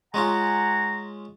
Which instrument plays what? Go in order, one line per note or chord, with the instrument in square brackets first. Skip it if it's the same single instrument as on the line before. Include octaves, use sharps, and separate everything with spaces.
[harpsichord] G#3 C#4 F4 [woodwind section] F#5 G#5 A#5